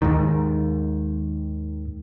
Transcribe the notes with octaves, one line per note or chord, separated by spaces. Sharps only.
D#2 G#2 D#3